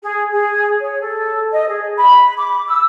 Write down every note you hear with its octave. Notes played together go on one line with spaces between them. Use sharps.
G#4
G#4
C#5
A4
D#5
G#4
B5
D6
E6